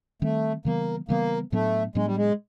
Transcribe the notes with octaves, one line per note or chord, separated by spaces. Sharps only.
D#3 G3 A3 C4
C#3 E3 G3 A#3 B3
C#3 E3 G3 A#3 B3
A2 F#3 A3 B3 D4
A2 F#3 G#3 B3 D4
G3
G#3